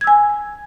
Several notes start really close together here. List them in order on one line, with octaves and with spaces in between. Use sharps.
G#6 E6 G#5